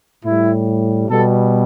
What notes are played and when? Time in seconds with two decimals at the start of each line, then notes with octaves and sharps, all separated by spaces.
0.25 A2 G3 E4
1.09 B2 G3 A4